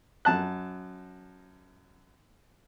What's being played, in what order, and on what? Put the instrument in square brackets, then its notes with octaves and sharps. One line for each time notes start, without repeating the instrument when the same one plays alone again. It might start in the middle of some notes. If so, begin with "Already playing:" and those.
[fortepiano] F#2 A5 F#6